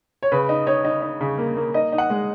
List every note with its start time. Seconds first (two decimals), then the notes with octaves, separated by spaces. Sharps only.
0.23 C#5
0.32 C#3 B4
0.49 D#4
0.67 D#4 C#5
0.84 D#4
1.02 D#4
1.21 C#3
1.38 A#3
1.57 A#3
1.74 D#4 D#5
1.92 D#4
1.98 F#5
2.10 G#3